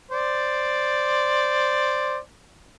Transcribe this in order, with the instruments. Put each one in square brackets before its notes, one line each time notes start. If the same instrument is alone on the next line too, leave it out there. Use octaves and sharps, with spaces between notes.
[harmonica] C5 D5